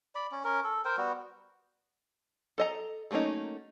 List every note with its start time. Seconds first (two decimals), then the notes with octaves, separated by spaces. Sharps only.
0.15 D5 B5
0.32 C#4
0.44 C#4 A#4
0.64 A4
0.85 A#4 C5 G5
0.97 G3 B3 F#4
2.58 A4 D#5 A#5
3.11 F#3 A3 A#3 C#4 D#4